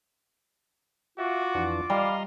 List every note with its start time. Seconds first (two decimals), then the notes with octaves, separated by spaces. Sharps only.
1.18 F4 F#4 E5 D6
1.55 F2 E3 D4
1.90 G3 D#5 F5 A#5 C6